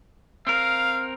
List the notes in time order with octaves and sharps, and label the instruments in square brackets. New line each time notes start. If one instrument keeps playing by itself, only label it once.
[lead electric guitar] C4 A#4 [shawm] F5